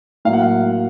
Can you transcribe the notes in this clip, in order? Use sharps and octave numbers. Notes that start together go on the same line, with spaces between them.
A2 F#3 A#3 F5
F#5
F5